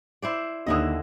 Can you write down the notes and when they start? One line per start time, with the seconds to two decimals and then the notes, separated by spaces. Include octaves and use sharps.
0.22 E4 C5 D5
0.66 D#2 D3 E4 D#5 D#6